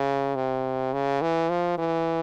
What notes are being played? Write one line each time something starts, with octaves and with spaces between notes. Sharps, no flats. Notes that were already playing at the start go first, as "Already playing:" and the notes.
Already playing: C#3
C3
C#3
E3
F3
E3